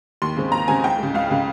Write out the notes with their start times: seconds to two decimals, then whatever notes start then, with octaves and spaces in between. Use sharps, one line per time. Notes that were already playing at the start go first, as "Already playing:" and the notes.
0.22 D#2 C6
0.36 C#3 G#3 C4
0.52 D#2 A#5
0.67 C#3 G#3 C4 G#5
0.84 C#2 G5
0.99 C#3 G#3
1.14 C#2 F5
1.31 C#3 G#3